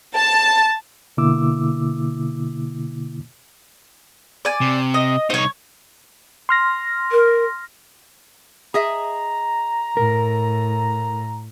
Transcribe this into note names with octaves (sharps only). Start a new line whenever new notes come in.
A5
B2 D3 A#3 E4 D6 E6
D5 G#5
C3
D#5
C2 D#4 C5 C#5
C6 F6 A#6
A#4
G#4 D#5 E5 A#5
A2 A#4